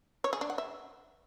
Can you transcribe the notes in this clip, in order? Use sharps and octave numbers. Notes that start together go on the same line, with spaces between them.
C#5
G#4
D4
F#5
E5